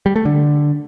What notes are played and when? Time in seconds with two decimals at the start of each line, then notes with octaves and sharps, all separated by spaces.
0.06 G3
0.16 A3
0.25 D3